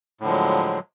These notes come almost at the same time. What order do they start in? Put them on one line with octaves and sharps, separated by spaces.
A2 D3 F3 G#3 F#3